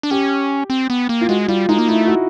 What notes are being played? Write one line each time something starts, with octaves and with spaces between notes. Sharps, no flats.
D4
C#4 G4
C4
B3
A#3
F4
G#3 F#4
G3 F4
G#3 D#4
A#3
A3 E4
F#4